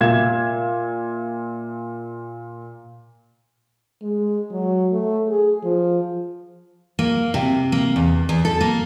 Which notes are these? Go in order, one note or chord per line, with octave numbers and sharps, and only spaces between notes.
A#2 E5 F5 G#6 E7
G#3
F#3
A3
G#4
F3
A#3
C3
A#3
E2
E2
A4
A#3